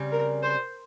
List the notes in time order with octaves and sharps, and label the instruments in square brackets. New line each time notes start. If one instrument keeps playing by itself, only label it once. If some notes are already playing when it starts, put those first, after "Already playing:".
Already playing: [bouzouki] C#3 G3 C4
[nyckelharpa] A#4
C5